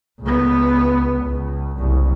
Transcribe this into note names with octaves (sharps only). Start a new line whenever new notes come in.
C#2 B3
C#2
F#1 C2